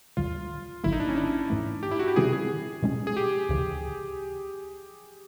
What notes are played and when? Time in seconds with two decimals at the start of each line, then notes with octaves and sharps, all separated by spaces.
0.17 D#2 D3 G3 F4
0.84 G#1 G2 D3 F#3 A#3 E4
0.93 D#4
1.00 D4
1.09 C#4
1.16 D4
1.50 G#2 E3 A3
1.83 G4
1.91 E4
1.99 F#4
2.08 G4
2.16 C3 D#3 G3 C4 F4 G#4
2.33 G#4
2.83 B2 G#3 C#4
3.07 G#4
3.17 G4
3.49 D2 C#3 E3